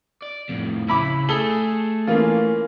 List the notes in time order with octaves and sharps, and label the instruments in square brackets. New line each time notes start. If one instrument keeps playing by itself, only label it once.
[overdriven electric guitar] D5
F2 A2
[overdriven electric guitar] C#3 [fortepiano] E4 B5 D6
[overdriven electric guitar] A3 [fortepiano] G#4 A4 [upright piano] G7
[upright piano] E3 A#3 C#4 [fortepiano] F4